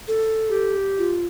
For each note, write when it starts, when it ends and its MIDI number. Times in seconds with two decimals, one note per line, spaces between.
0.08 0.75 69
0.50 1.18 67
0.98 1.26 65